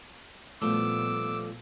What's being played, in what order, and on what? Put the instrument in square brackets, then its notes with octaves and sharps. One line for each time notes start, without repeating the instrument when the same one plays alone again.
[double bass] A#2 B3 [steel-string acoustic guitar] F3 G3 A3 [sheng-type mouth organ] D6 E6